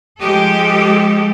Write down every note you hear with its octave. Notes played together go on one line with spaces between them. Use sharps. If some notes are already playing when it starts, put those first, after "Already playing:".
F3 G#3 G4 A4